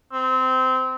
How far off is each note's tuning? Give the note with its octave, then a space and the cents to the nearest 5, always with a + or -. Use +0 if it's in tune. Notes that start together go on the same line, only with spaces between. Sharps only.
C4 -20